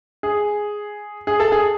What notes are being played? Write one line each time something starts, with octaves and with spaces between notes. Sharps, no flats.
G#4
G#4
A4
G#4